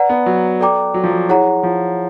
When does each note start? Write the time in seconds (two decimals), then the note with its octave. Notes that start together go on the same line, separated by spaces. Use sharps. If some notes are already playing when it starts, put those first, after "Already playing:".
Already playing: B4 D5 F#5 A#5
0.10 B3
0.26 F#3
0.61 A4 D5 G5 A#5 D6
0.94 F#3
1.03 F3
1.11 F#3
1.29 E4 G#4 C#5 F#5 A#5
1.63 F3